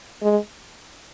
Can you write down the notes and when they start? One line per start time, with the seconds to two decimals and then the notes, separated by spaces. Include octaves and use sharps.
0.22 G#3